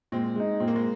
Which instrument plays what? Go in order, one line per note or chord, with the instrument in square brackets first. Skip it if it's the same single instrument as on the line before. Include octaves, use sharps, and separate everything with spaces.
[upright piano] A#2 [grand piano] G#3 C4
[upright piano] G#3 D#4
[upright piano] A#2 [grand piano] C4
[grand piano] A#3
G#3